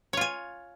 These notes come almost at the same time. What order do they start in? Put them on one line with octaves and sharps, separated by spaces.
C#5 F4 G#5